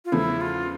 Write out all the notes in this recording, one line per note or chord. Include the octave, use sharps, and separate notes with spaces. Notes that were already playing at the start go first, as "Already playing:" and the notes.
F4
E2 C#3 F3 A3 E4
F4